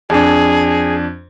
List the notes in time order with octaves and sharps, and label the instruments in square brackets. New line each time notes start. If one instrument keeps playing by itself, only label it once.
[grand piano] F2 D4 [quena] G#4